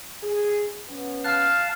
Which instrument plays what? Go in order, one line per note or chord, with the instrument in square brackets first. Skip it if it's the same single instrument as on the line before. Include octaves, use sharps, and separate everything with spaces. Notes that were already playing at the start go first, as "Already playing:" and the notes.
[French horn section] G#4
B3 C#4
[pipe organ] F5 A5 [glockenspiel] F6 F#6